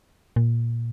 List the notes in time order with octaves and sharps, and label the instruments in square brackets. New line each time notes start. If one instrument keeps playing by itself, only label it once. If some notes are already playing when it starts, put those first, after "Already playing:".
[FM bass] A#2